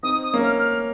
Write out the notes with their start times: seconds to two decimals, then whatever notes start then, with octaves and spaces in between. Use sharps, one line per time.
0.03 C4 D#4 D#6
0.23 D#6
0.33 A#3 C#4
0.44 F6
0.59 F6